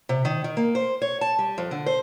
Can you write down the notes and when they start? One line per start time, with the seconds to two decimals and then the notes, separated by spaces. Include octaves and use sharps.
0.09 C3
0.25 D#3
0.44 D#3
0.57 A#3
0.75 C5
1.02 C#5
1.21 A5
1.39 G3
1.58 F2
1.71 D3
1.86 C5